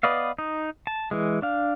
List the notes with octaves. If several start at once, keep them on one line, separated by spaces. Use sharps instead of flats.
B3 B4 D5 D#5 F5
D#4
A5
E3 G#3
D4 F5